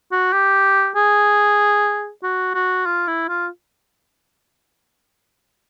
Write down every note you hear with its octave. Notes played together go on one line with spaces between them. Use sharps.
F#4
G4
G#4
F#4
F#4
F4
E4
F4